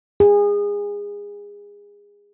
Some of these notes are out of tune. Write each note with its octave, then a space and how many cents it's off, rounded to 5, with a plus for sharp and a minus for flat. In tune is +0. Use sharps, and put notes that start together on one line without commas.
G#4 -25